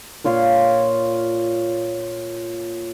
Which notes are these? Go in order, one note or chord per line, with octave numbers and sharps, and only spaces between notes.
A#2 F4 C#5 C6